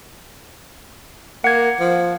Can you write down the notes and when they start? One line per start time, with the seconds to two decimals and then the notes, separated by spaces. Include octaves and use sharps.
1.44 A#3 F#5 G#6
1.80 F3